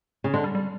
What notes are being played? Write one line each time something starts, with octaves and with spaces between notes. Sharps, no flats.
C#3
D3 G#3
G3
G3